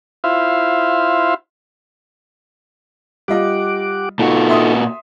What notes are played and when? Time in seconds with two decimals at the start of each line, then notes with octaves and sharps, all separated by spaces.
0.24 E4 F4 C5 E5 F5
3.28 G3 F4 G4 D#5 F#5 D6
4.19 A#2 D#4 F4 F#4 A4
4.49 E5 C6 D#6